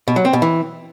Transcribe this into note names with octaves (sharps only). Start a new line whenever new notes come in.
B2
F#3
C4
B2
E3